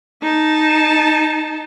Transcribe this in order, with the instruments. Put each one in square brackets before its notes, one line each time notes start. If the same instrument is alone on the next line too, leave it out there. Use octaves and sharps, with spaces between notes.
[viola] D#4 A5